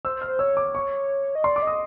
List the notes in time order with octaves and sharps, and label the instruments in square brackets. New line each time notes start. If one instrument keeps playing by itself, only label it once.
[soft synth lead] C5 [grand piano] E6
[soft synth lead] C5
[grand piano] F6
[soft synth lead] C5
[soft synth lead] C#5 [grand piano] E6
[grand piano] D6
C#6
[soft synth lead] D#5
[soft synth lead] D5 [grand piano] C6
[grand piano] D6
[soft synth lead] D#5 [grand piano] D#6